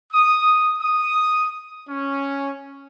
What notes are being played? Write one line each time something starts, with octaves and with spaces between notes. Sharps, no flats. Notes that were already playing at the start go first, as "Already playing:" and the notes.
D#6
D#6
C#4